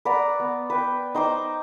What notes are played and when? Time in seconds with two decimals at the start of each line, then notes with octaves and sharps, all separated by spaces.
0.05 B4 D5 F#5 A#5
0.40 B3
0.70 B4 G5
1.15 D#4 C5 G5 D6